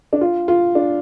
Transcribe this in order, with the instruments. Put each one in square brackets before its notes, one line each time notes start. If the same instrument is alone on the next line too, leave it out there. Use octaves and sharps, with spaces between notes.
[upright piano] D4
F4
F4
D4